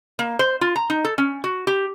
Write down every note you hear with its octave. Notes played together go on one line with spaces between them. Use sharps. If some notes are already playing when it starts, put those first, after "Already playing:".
A#3
C5
F4
A#5
D#4
A4
C#4
F#4
G4